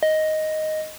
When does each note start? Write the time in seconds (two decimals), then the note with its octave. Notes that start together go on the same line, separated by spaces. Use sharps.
0.03 D#5